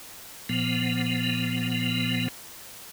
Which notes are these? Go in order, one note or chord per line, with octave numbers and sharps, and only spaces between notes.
A#2 F3 B3